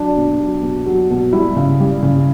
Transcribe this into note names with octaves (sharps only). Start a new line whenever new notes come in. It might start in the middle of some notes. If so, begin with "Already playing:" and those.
Already playing: F#3 D4
B2
F#3
B2
F#3
B2
G3 E4
C#3
G3
C#3